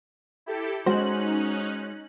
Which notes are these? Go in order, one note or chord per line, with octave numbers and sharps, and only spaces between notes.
E4 G4 A4
G#3 C#4 D#4 F#4 C5 F#6